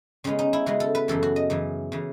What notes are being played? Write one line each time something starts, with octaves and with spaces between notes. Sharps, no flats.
C#3 G#3 B3 C#4
D#4
E4
C#3 G#3 B3 F#4
A4
B4
F#2 C#3 E3 A4
F#4
D#5
F#2 C#3 E3
C#3 E3